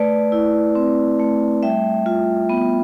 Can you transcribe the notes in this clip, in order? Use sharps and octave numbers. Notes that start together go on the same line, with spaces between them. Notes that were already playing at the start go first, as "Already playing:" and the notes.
Already playing: A3 B4 D5
E4
C4
A3
G3 E5 G5
F4
B3